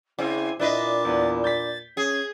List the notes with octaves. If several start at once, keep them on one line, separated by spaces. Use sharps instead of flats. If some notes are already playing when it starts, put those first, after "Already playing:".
C#3 C4 E4 G#5
A#2 D4 E4 B4 D#5 A6
E2 B3
G6 A6 B6
C#4 G#4 G#6